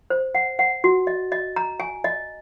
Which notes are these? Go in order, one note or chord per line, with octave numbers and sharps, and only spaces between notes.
C5
F#5
F#5
F#4
D#5
D#5
A#5
G#5
D#5